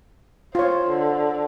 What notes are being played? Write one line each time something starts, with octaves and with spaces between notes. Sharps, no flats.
F4 C5 C#5
D3